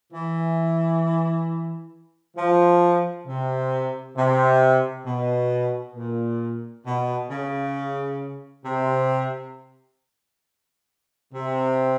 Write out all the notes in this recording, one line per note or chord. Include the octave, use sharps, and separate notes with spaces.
E3
F3
C3
C3
B2
A#2
B2
C#3
C3
C3